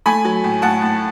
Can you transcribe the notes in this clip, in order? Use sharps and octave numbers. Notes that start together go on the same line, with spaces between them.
A3 G#5 B5
F#3
A2
A2 F#5 A5
A2